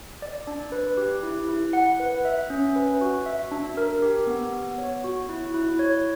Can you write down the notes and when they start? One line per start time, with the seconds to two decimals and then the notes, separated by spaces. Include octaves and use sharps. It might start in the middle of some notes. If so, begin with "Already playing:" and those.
0.22 D5
0.47 D4
0.72 B4
0.97 G4
1.23 E4
1.49 E4
1.73 F#5
2.00 B4
2.25 E5
2.50 C#4
2.76 B4
3.01 F#4
3.26 E5
3.51 D4
3.77 A#4
4.02 G4
4.27 B3
4.52 B3
4.78 C#5
5.04 F#4
5.29 E4
5.54 E4
5.79 C#5